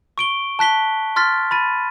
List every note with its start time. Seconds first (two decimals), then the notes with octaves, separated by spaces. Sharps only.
0.18 C#6 D7 G7
0.59 A5 F#6 B6 G7
1.16 C6 F6 A6 B6
1.51 B5 A6 D#7